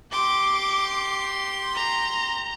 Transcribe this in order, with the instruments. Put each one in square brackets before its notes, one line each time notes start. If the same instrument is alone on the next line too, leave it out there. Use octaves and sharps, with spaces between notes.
[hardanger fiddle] G4 C6 [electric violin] D6
[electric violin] A#5